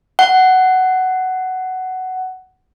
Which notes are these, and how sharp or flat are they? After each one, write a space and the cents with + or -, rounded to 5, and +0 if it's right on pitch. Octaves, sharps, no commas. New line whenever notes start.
F#5 +10